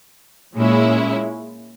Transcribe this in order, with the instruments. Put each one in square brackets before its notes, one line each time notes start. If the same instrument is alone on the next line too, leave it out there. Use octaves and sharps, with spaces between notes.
[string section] A#2 G#3 C#4 E4